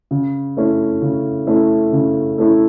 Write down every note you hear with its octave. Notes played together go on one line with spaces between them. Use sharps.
C#3
A3 C#4 E4
C#3
A3 C#4 E4
C#3
A3 C#4 E4